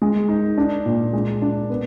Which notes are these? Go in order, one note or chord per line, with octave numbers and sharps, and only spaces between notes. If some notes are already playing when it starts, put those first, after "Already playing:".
G#3
D#4
D4
A#2
G#3
D4
B3